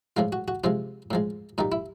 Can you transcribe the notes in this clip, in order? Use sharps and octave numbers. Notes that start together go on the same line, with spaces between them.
A2 F3 G#3 F4
F#4
F#4
C3 F3 G#3 F4
A2 F3 G#3
A#2 G3 D#4
E4